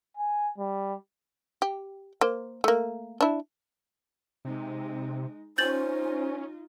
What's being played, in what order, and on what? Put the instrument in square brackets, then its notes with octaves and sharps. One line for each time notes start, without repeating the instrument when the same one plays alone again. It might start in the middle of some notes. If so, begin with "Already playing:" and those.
[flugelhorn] G#5
G3
[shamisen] G4
A#3 C5
A3 A#3
D4 E4
[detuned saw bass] C3 [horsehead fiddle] G#3 D#4
[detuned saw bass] C#4 [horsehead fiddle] D#4 F4 [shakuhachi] C5 [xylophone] G6 A6 F#7